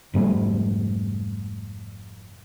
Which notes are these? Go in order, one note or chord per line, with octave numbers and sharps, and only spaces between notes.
F1 G#2 G3 A3